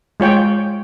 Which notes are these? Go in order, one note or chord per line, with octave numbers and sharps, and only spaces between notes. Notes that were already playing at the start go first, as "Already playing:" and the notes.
G#3 F4 C#5 G5